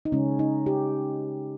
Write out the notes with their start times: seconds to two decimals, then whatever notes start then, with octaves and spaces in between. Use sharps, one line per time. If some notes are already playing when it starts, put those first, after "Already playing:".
0.05 D#4
0.12 C#3 G#3 C#4
0.39 D#4
0.66 G4